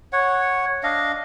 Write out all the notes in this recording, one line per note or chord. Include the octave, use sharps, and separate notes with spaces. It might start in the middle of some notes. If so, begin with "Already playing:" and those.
C#5 F#5
D4 D#5 F5